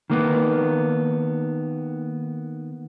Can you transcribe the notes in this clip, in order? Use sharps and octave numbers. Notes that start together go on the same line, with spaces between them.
D#3 A#3 B3